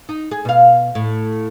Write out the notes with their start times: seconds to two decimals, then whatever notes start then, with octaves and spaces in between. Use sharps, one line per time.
0.09 D#4
0.31 G#4
0.45 B2 F5
0.95 A2